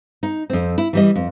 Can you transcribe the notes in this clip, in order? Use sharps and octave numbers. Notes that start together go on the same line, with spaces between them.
D#4
F2 C4
E4
E3 G3 D#5
F2